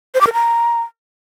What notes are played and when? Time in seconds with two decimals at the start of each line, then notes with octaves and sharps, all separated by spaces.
0.15 C5
0.21 D6
0.27 A#4
0.33 A#5